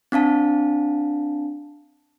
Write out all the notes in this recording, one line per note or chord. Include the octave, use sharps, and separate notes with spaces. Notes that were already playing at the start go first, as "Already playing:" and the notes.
C4 D4 F5 A5